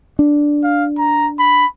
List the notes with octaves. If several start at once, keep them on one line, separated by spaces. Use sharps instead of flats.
D4
F5
A#5
B5